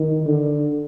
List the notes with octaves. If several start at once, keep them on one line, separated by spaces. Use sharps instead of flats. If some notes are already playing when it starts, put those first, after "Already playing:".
Already playing: D#3
D3